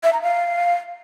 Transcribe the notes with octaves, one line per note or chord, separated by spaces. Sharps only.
E5
A#5
F5